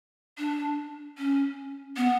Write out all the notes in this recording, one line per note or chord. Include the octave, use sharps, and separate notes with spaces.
D4
C#4
B3